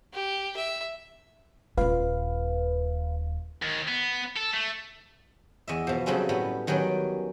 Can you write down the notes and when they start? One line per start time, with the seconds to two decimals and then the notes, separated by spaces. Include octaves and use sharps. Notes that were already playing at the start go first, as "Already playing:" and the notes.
0.13 G4
0.56 E5
1.77 D#1 F4 B4 F5
3.63 D#2
3.88 B3
4.37 A4
4.54 A3
5.68 E2 D#5 E5
5.87 B2 F3
6.06 C#3 F#3 G3 A3 C4 C#4
6.29 A2 G3 B3
6.67 D#3 F#3 G3 C#4 D5